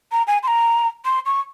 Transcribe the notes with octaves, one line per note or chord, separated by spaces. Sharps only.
A#5
G#5
C6
A#5
C6
C#6